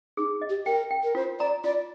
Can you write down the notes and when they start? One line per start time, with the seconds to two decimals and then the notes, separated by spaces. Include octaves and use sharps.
0.17 D#4 G#4
0.41 D#5
0.49 G4
0.66 A#4 G5
0.91 G5
1.03 A#4
1.15 F4 C5
1.39 D5 A#5
1.64 F4 D5